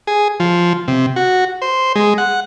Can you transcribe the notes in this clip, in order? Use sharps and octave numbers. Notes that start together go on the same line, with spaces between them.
G#4
F3
C3
F#4
C5
G#3
F#5